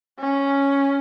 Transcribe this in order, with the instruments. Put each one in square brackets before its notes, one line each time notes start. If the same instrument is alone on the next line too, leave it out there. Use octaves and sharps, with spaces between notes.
[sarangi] C#4